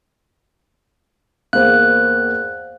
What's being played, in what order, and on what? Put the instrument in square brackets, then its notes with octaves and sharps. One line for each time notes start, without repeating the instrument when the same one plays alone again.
[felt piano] E2 A#3 [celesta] C5 F5 [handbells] F#6